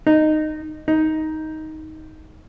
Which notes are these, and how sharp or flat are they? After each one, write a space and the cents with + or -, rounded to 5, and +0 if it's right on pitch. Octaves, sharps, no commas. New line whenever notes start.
D#4 -15
D#4 +10